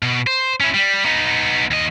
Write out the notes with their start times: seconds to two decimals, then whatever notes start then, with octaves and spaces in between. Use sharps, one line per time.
0.02 B2
0.27 C5
0.60 C#4 E4
0.74 G3
1.05 B3 D#4
1.71 D#2 D#5